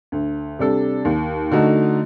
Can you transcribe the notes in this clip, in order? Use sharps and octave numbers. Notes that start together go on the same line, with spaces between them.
D2
C3 G3 D4 A4
D#2
D3 A3 D#4 F#4